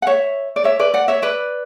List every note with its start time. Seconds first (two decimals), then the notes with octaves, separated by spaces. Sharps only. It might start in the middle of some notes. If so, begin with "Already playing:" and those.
0.02 F#5
0.07 C#5 E5
0.56 D5
0.64 C#5 E5
0.79 B4 D5
0.94 D5 F#5
1.08 C#5 E5
1.22 B4 D5